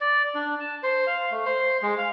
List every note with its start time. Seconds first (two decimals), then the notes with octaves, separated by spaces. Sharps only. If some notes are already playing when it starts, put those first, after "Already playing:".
0.01 D5
0.35 D4
0.60 A5
0.83 C5
1.07 F5
1.31 A3
1.46 C5
1.83 G#3
1.98 F5